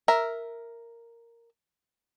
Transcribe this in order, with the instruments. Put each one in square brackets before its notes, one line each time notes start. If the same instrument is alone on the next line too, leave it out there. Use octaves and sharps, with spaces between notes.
[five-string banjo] A#4 E5